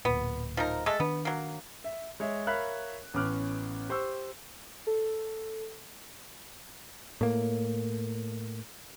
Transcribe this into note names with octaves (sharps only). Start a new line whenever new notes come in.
D1 A#2 B3
F3 D#4 A#4
G#3 A3 A4
D#3 B3 D4
F#3 A#3
E5
G#3 C#5 E5
A#4 C#5 E5 F5 B5 F#6
A1 B3 C#4 D6 F6 F#6
G4 C5 C#6 E6
A4
A2 A#3